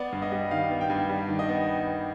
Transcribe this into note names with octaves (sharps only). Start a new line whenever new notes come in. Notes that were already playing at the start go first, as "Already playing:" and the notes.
Already playing: B3 D5
G2
D#5
G3
D#3 F5
B3
G5
G2
G3
D#3
D#5
B3